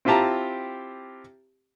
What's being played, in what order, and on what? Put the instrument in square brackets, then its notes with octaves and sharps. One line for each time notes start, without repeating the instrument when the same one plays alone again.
[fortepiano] C4 E4 F4 G4 A5 A#5